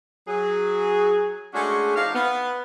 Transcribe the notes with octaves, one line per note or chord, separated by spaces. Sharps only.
F#3 G#4
G#3 A3 C#4 D4 F#4 G#4
F3 D#4 D5 F5
B3